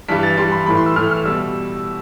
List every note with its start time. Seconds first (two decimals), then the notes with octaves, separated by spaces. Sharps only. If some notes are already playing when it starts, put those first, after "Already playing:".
0.08 G2 E3 G3 B6
0.23 A6
0.37 G2 E3 G3 C6
0.52 B5
0.66 A2 E3 A3 B5
0.77 C6
0.86 E6
0.96 A2 E3 A3 F6
1.11 F6
1.25 B2 G3 E6